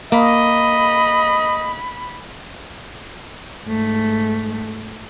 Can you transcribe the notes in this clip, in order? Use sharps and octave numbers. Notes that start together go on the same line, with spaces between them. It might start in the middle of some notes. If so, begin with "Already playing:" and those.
A#3 D#5 B5
G#2 A3